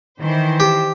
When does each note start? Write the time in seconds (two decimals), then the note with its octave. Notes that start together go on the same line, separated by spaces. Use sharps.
0.21 D#3 E3 C5
0.60 G4